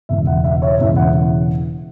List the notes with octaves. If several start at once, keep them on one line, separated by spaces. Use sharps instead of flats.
E1 E2 C#3 E3 E5
F#5
E5
C#5
E1 E2 C#3 E3 E5
F#5